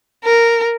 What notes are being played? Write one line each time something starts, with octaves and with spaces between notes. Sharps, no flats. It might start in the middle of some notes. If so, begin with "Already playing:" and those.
A#4